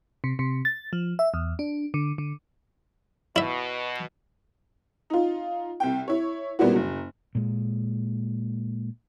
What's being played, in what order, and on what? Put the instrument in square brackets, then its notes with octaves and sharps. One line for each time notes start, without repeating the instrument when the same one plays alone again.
[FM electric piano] C3
C3
A6
F3
E5
E2
D4
D3
D3
[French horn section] B2 [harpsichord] E4 E5
[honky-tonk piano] D#4 F4
C2 G5
E4 C#5
A#2 G3 B3 C4 E4 F#4
F#1 F#3
[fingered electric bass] A#2 G#3